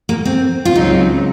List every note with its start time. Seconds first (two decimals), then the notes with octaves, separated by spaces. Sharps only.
0.09 A#3
0.25 C4
0.65 F4
0.75 C#2 C#3 F#3 C4 D#4